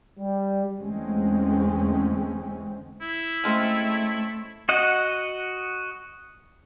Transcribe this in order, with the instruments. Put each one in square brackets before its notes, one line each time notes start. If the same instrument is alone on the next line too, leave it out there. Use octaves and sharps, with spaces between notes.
[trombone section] G3
[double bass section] E2 D3 G#3 A3 C4 C#4
[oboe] E4
[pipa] C#3 G#3 C4 [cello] A3
[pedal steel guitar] F#4 D#5 F#5